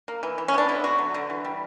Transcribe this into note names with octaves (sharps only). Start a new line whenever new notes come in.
A#3
E3
E3
C#4
B3 D4
D3 E4
D3 F#4
F#3
D3
E3
G3